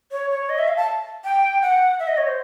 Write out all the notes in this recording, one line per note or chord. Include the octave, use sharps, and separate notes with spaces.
C#5
C#5
D#5
E5
F5
A5
G5
F#5
E5
D#5
C#5
C5